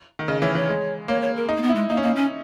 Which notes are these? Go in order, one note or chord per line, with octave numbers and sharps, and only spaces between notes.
D#3
C#3 D#5
E3 C#5
E3 C#5
G#3
A#3 C#5
C#5
A#4
D#4
A#3
B3
E4
G#3
A#3 D#4
C#4
A#3 D#4
C#4